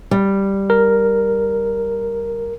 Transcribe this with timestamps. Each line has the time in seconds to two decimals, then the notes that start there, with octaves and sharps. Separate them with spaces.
0.11 G3
0.70 A#4